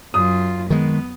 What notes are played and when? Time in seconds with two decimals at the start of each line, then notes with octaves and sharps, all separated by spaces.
0.14 F#2 F4 D#6
0.70 D#3 G#3 B3